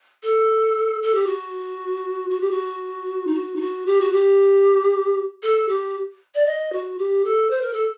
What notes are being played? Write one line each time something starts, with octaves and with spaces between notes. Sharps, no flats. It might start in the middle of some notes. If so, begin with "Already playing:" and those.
A4
A4
G4
F#4
F#4
G4
F#4
D#4
F#4
D#4
F#4
G4
F#4
G4
A4
G4
D5
D#5
F#4
G4
A4
C5
A#4
A4